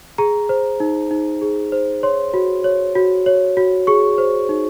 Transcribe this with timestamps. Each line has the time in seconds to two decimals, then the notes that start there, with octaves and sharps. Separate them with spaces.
0.18 G#4 A#5
0.49 C5
0.80 D#4
1.11 D#4
1.42 G#4
1.72 C5
2.03 C#5 C6
2.34 F#4
2.64 C#5
2.95 F#4
3.26 C#5
3.57 F#4
3.87 G#4 C#6
4.18 C5
4.49 D#4